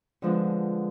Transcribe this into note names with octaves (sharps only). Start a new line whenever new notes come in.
D3 F3 G#3 B3 D4